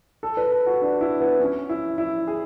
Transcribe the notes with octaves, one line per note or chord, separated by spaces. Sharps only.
A4
B4
A4
F#4
D4
E4
B3
C#4
E4
E4
G#4